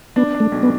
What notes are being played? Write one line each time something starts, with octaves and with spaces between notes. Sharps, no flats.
B3 D4
D4
A3
B1
B3